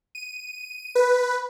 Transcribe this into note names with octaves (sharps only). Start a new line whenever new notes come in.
D#7
B4